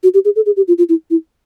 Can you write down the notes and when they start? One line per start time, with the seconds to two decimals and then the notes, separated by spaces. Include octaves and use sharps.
0.03 F#4
0.14 G4
0.25 G#4
0.36 A4
0.46 G#4
0.57 G4
0.68 F4
0.78 F4
0.89 E4
1.10 E4